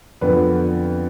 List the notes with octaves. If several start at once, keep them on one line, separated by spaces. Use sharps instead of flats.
F2 D3 B3 B4